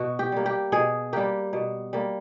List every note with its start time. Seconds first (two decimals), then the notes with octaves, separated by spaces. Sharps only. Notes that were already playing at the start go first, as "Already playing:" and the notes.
Already playing: B2 F#4
0.19 G4
0.32 G3 A#3
0.46 G4
0.72 B2 G#4
1.13 G3 A#3 G4
1.53 B2
1.93 G3 A#3